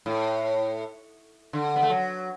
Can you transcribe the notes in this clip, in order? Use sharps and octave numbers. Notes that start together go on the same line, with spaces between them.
A2
D3
B3
A3
F#3